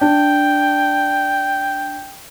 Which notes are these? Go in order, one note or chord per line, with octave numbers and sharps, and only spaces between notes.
D4 G5